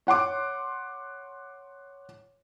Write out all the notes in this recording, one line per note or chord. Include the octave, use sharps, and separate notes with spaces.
C#5 F#5 C6 D6